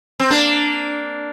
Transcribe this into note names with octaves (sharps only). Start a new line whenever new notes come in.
C4
A#3 D4